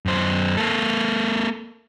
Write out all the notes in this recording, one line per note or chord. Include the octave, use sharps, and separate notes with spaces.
F#2 C5
A#3 A4